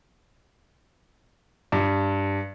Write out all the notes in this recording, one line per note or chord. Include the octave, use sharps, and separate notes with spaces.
G2